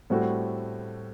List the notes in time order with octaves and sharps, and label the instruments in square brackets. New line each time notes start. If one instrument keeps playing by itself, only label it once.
[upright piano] A2 G3 C4 F#4 A4